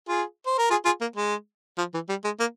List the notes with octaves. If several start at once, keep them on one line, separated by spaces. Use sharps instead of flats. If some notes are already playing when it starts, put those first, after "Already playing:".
F4 G#4
C5
A#4
F4 G#4
F4 G#4
A#3
G#3
F3
E3
G3
G#3
A#3